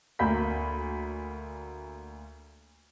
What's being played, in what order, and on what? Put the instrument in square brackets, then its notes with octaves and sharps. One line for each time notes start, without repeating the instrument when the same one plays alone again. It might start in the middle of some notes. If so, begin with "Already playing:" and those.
[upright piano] D2 A#3 B5 G6 B6